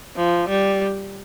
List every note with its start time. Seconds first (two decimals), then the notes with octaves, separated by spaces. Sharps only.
0.16 F3
0.49 G3